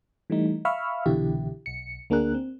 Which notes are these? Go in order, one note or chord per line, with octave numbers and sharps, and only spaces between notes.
E3 G3 A3 D#4
E5 F5 B5 C#6 E6 F6
C2 B2 D3 E3 E4 G4
B1 C#7
D2 A#3 D4 G#4 A#4 F#6
C4